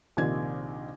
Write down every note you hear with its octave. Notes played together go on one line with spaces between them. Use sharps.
A#1 C3 D#3 F4 G#6